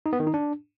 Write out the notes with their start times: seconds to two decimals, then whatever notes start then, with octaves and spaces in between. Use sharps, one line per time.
0.06 D#4
0.13 B3
0.20 D#3
0.27 D#4
0.34 D4